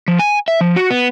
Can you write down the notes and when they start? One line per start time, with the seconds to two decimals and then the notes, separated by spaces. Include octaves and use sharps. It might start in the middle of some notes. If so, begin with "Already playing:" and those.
0.08 F3
0.19 G#5
0.48 E5
0.61 F3
0.76 F#4
0.90 B3